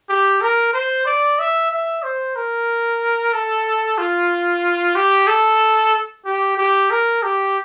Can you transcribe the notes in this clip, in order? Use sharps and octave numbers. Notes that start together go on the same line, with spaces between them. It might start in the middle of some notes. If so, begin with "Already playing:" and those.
G4
A#4
C5
D5
E5
E5
C5
A#4
A4
F4
G4
A4
G4
G4
A#4
G4